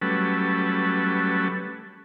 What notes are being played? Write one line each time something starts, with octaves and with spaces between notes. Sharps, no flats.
F#3 G3 A3 C#4 A4 B4